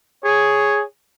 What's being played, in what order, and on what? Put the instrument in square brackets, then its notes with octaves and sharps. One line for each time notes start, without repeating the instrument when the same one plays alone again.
[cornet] G#4 [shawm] C#5